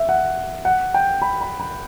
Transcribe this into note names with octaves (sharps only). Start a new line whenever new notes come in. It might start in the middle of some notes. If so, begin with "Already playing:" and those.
Already playing: E5
F#5
F#5
G5
B5
B5
B5